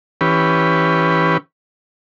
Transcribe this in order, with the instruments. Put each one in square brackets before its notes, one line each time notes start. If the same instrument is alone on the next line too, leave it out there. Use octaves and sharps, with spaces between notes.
[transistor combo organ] E3 C#4 G4 B4